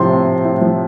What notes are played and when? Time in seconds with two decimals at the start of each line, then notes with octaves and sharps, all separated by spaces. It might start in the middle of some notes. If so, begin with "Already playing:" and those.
Already playing: A2 C3 F3 C6
0.10 C4
0.27 A2
0.45 A2
0.61 F3